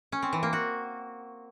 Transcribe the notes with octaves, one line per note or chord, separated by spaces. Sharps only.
C#4
C4
E3
A#3
F#4